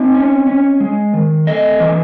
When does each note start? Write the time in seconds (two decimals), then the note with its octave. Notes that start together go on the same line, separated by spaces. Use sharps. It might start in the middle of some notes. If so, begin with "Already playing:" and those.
Already playing: C4 D#4 D#5
0.14 C#4
0.47 C#4
0.80 G#3
1.13 D#3
1.47 A3 D#5
1.80 E3